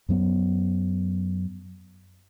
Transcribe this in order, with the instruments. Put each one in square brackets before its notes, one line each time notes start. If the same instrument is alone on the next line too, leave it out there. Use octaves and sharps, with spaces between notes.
[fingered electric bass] F#2 F#3 B3